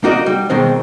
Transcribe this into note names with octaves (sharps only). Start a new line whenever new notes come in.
A#3 D#4 F#4 A#4 D5 D#5
G3
B2 D#3 G#3 C4